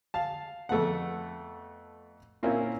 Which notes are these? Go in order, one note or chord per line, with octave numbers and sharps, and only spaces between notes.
F5 A5
F2 A3 B3 F#5
A#2 A#3 C4 C#4 E4 F4